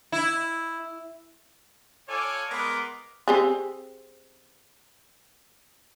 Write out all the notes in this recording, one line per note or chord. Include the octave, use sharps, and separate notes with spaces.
E4
F4 A4 C#5 D5 G#5 D6
G#3 B3 A#4 B4 C6 D6
C4 G4 G#4